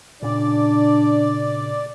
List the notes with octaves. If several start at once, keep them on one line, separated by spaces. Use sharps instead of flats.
A#2 C#3 D4 D5